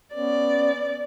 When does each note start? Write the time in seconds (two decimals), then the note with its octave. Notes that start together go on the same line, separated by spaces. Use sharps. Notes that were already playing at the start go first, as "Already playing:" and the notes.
0.15 B3 C#4 D5